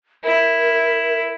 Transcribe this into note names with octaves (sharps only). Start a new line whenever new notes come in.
E4 A#4